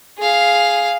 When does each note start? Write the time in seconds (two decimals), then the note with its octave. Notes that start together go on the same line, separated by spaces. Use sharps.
0.18 G#4 F5